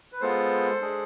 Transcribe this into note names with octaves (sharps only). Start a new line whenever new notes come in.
B4
G#3 B3 F4 A4 C5
G#3 D4 G#4